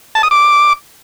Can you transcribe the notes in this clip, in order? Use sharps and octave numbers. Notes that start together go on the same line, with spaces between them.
A5
D#6
D6